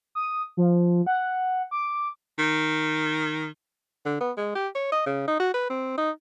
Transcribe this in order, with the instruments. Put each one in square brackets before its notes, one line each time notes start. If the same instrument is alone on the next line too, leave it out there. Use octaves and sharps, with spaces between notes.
[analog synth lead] D#6
F3
F#5
D6
[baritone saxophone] D#3
[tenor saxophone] D3
B3
G#3
G4
C#5
D#5
C#3
D#4
F#4
B4
C4
D#4